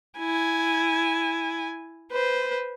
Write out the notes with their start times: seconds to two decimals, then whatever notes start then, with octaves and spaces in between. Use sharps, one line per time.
0.19 E4 G#5
2.12 B4 C5